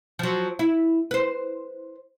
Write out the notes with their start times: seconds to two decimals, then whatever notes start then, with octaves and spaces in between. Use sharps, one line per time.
0.19 F3 F#3
0.59 E4
1.11 B4 C5